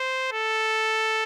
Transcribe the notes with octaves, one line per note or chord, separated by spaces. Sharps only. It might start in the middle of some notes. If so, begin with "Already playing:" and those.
Already playing: C5
A4